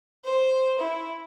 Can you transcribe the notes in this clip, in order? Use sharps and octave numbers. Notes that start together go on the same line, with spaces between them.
C5
E4